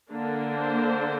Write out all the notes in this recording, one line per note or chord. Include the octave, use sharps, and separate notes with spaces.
D3 A#3 D4
C5